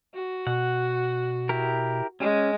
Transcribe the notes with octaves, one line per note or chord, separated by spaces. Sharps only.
F#4
B2 F#5
E4 G4 A#4
G#3 C#4